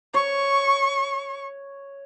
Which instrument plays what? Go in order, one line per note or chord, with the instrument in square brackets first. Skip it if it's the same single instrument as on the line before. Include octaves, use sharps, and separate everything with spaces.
[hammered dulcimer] C#5 [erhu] C#6